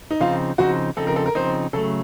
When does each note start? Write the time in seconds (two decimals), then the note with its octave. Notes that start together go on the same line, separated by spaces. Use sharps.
0.11 D#4
0.21 C#3 F3 C4 D#4 F4
0.58 C#3 F3 C4 D#4 F#4
0.97 C#3 F3 C4 D#4 A4
1.07 A#4
1.16 A4
1.26 A#4
1.35 C#3 F3 C4 D#4 C5
1.73 C#3 F#3 A3 A4